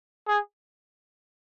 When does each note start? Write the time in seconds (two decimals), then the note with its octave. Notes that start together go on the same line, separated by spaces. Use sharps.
0.28 G#4